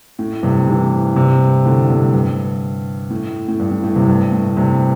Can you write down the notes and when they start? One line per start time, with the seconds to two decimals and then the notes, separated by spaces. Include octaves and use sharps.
0.19 A2
0.43 G2 C3
0.67 C3 E3
1.16 G2 C3
1.65 A2 D3
1.89 G2 C3
2.14 G2
3.10 A2
3.48 A2
3.60 G2
3.71 A2
3.84 A2
3.96 G2 C3
4.08 G2
4.32 A2
4.57 G2 C3